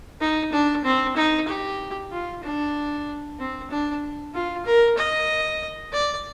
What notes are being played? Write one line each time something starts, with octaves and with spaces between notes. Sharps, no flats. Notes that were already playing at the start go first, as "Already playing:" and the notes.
D#4
D4
C4
D#4
G4
F4
D4
C4
D4
F4
A#4
D#5
D5